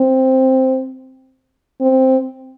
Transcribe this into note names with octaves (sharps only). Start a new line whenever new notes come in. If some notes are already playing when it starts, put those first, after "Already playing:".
Already playing: C4
C4